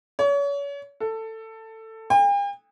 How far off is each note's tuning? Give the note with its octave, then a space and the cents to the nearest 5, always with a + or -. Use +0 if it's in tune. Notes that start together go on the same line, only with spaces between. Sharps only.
C#5 +35
A4 +15
G5 +45